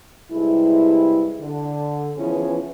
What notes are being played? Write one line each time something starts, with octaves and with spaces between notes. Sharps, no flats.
G2 C3 G#3 E4
D3
E3 F3 B3 C#4 E4 G#4